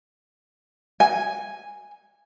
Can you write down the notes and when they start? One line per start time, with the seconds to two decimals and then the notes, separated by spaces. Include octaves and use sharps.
1.00 G#5